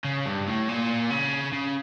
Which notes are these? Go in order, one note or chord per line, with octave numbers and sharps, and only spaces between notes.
C#3
G2
A2
A#2
C#3
C#3